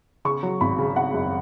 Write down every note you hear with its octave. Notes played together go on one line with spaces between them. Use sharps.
C#3 C#6
F#3
G#1 B5
C#3
C#3 F#5
F#2